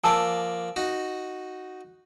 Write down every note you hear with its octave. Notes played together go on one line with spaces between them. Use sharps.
F3 A#3 D5 G#5 A5 E6
D#4 F#4